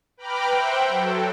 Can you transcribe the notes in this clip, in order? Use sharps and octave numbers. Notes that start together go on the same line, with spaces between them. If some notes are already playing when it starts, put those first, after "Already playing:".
B4 G5 A#5 B5 D6 F6
C5 E5 F#5 G5
F#3 A4